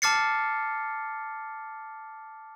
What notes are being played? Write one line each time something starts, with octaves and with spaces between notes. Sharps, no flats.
A5 D6 F6 A6 C7 C#7